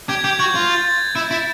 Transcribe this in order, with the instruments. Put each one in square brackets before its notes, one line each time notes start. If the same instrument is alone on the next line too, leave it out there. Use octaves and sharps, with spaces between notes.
[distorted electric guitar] G4 [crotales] G#6
[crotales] G#6
[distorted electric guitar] G4 [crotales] G6
[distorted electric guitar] F#4 [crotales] G#6
[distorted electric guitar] F4
[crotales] A6
A6
[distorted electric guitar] E4
E4